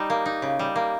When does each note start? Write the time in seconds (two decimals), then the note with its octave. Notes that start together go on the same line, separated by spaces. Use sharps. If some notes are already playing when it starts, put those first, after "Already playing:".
Already playing: G3 D#4
0.10 A#3
0.26 D#4
0.42 C#3
0.59 G3
0.76 A#3